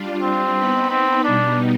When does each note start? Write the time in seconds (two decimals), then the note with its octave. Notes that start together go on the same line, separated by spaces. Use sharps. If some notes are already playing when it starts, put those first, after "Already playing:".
Already playing: G3 D4 F4
0.21 C4
0.56 B3 D#4 B4
0.90 C4
1.24 B2 G3 B3 D4 D#4